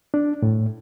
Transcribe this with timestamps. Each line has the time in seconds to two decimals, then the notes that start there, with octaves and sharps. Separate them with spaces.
0.14 D4
0.42 A2